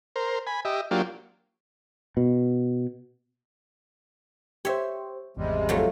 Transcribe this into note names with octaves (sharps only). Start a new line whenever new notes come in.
A#4 C5
G#5 B5
G4 D#5 E5
F#3 A#3 D4 F4 G4
B2
G4 C5 C#5 E5
G#1 E2 C3 G3 G#3
F3 F#3 A3